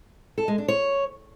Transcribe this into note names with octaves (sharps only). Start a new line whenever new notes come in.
A4
G#3
D4
C#5